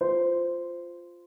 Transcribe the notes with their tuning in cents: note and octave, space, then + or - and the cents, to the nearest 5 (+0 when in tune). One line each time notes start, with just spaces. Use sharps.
F4 +0 C5 -10